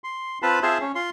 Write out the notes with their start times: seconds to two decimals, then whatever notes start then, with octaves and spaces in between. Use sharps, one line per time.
0.04 C6
0.42 C4 F4 B4 A5 B5
0.62 C4 F4 G#4 C5 E5 A5
0.81 C#4
0.95 F4 C6